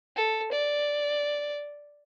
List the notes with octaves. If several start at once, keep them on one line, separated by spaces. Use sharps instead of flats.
A4
D5